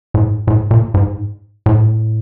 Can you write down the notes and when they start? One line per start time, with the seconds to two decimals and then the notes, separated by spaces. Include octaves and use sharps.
0.14 A2
0.23 G#2
0.47 A2
0.71 A#2
0.94 G#2
1.66 A2